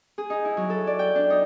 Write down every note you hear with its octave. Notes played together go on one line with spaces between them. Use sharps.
G#4
D#4
E4
F#3
A4
D5
G5
D4
D#4